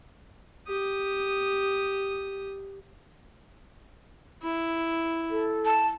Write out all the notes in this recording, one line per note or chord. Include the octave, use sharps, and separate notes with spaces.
G4 D#6
E4
A4
A5